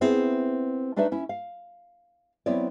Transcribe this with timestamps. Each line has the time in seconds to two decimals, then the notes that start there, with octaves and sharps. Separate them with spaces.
0.01 B3 C4 E4 G#4
0.96 A3 D4 D#4 B4 D5 E5
1.12 C#4 E4 E5
1.29 F5
2.46 F#3 B3 C4 E4 C#5 D5